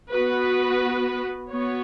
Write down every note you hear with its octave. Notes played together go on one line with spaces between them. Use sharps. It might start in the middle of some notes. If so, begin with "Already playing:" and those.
B3 F#4 B4
B3 F#4 C#5